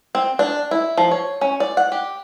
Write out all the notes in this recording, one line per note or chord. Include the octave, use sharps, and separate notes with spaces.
C4
D4
E4
F3
C#5
C#4
D5
F#5
G4